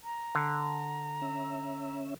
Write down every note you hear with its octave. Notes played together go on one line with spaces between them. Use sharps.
A#5
D3
C#4 E5